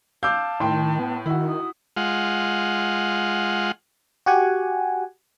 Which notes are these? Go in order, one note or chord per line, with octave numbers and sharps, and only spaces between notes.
F5 A5 D6 E6 G6
A2 D#3 G5 C6
B3
D#3 E4 F#4
D#6
G#3 F4 F#5
F#4 G4 F#5 G#5